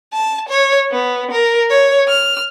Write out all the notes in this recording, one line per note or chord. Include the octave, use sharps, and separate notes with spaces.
A5
C#5
B3
A#4
C#5
F6